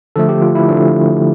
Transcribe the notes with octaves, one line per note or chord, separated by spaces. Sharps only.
D3 F3 A3 A4
G4
F4
E4
D3 F3 A3 D4